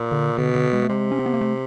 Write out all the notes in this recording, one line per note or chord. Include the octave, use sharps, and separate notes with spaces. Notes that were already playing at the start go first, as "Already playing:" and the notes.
Already playing: A#2
D3
B2 D3
D3
G#3
A3
C3 G#3
C#4
C4
B3
A#3
A3